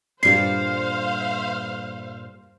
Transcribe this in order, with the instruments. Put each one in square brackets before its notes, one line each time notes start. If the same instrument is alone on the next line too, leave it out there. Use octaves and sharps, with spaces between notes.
[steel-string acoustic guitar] G2 A#2 A4 [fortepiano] G3 D4 [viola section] C5 F5 [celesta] C7